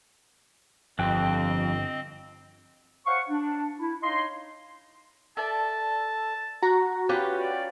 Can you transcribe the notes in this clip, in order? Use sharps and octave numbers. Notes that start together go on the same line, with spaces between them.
G1 F2 C4 D#5 G5 F#6
C5 C#5 F5 F#5 C#6
D4
E4
D#4 C#5 D#5 F5 C6
A4 D5 E5 A5
F#4 A#5
C#4 F4 G4 B4 F#6
D5